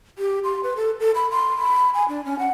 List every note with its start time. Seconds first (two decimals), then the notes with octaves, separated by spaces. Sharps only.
0.18 G4
0.44 C6
0.63 B4
0.76 A4
1.00 A4
1.15 B5
1.30 C6
1.58 B5
1.94 G#5
2.08 D4
2.25 C#4
2.39 F#5